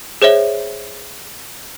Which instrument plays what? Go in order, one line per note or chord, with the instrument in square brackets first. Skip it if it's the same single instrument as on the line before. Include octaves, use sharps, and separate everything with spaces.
[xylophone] G#4 C5 C#5 E5 G7